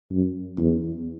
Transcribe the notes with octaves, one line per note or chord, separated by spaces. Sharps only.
F#2
E2